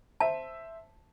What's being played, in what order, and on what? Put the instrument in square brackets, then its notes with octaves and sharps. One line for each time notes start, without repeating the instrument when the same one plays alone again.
[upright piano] C5 E5 [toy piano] A5